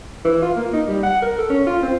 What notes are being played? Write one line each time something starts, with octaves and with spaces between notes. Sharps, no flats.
E3
F4
A#3
D#4
G3
F#5
A#4
A4
C#4
F4
C4